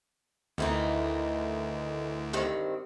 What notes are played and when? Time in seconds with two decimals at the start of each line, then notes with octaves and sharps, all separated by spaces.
0.58 D2 D#3 E3 D#4
2.33 G2 D#3 C4